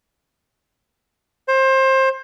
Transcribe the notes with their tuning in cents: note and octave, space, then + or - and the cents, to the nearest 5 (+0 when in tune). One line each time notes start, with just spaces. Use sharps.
C5 +25